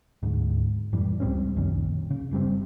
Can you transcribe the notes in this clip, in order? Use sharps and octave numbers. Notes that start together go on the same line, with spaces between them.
D2 G#2
F#2 A2 E3 G3
C#2 G3 C4 C#4
A#1 F#2 D#3 C#4
C#3
F#1 G2 G3 C4